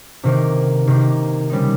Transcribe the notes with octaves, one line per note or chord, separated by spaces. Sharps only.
C3 D#3 A#3
C3 D#3 A#3
C#3 G3 C4 D#4